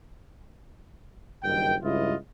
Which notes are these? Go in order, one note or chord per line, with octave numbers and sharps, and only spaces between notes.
F#1 G2 D#3 G5
C#2 G2 E4 F4 D#5